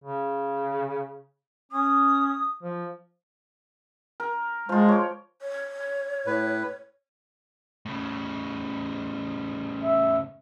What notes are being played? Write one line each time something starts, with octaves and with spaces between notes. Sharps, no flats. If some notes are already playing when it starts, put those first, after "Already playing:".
C#3
C#4 D#6
F3
A#4
F3 G#3 F4
C#5 D6
C#5
A2 B4
A2 C#3
E5